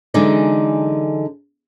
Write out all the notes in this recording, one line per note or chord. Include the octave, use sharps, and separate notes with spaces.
D3 E3 F#3 G#3 D#4 D5